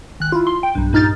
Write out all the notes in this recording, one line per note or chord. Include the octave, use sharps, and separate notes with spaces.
G#1 F#6
E4 F4
C6
G5
B1 G2
G2 A#2 D#4 F6 G6 A6